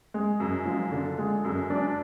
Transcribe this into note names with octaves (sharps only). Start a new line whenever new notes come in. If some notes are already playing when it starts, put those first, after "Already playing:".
G#3
F#2
F3
D3
G#3
F#2
D4